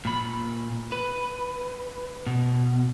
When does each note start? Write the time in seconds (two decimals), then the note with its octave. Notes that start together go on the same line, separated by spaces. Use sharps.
0.05 A#2 B5
0.92 B4
2.26 B2